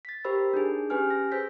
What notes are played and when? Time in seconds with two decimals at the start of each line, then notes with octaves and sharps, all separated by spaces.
0.05 A6 B6
0.25 G4 A#4 C5 B5 E6
0.54 D4 D#4 G#4
0.90 C#4 G4 B4 G#5 F6
1.10 A#6
1.32 G#4 C5 E6 G6 B6